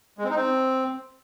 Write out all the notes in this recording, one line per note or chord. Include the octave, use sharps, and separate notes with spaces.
G#3
C4
D#4
C4